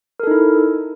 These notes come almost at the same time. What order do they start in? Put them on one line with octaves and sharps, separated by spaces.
A#4 A4 D#4 E4